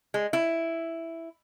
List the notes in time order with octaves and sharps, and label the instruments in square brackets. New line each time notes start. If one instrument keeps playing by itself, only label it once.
[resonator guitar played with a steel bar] G#3
E4